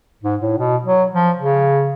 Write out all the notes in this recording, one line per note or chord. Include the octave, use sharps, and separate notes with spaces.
G#2
A2
B2
F#3
F3
C#3